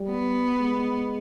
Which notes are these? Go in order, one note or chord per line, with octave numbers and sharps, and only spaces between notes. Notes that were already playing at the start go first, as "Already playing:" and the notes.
Already playing: G3
B3
G#3